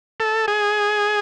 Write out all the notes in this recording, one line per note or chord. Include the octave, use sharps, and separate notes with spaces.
A4
G#4